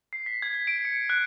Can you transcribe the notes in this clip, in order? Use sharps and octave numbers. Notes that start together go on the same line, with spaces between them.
C7
B6
G#6
B6
D7
C#7
F#6